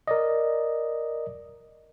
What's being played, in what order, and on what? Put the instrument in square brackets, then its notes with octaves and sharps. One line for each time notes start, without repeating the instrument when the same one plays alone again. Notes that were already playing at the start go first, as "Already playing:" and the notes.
[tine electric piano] A#4 D5 D#5